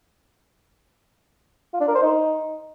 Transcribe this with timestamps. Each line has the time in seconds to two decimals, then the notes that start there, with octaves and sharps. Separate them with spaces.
1.74 F4
1.81 D4
1.88 A#4
1.95 C5
2.02 D#4